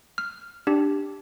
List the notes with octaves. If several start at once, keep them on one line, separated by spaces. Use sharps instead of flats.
F6
D4 G4